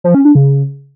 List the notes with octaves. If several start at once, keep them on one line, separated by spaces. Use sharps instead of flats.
F3
C#4
D4
C#3